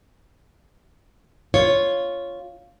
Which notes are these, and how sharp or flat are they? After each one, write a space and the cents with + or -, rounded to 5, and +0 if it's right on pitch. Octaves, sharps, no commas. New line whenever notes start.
F4 +0 C#5 +0